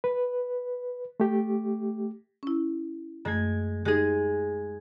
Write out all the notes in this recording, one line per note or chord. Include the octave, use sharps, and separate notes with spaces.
B4
A3 G4
C#4 E4
F#2 G#3 A3 G#6
G#3 D#4 G4 G#4